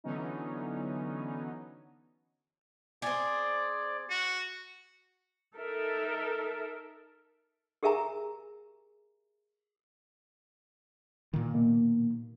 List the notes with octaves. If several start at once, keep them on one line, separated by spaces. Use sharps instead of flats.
D3 E3 F#3 B3 C#4 D#4
C4 G#4 D5
F#4
D#4 A4 A#4 E5
G4 G#4 A#4 E5 G#5 A#5
A#2 D#3
B2 A#3